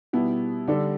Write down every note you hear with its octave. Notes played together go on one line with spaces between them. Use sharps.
B2 G3 B3 E4
D3 G3 D4 A4